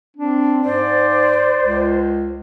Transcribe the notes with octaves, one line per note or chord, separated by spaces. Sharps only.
C4 D4
G#2 C5 D5
C#2